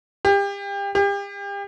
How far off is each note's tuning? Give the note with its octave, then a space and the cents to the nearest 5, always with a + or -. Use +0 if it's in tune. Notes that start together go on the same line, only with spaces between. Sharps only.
G4 +30
G4 +35